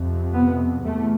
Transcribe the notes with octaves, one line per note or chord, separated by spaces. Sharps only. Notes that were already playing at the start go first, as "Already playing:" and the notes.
Already playing: F2 C3
B3
E2 A3